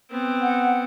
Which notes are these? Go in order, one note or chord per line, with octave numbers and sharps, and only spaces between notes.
B3 C4
F#5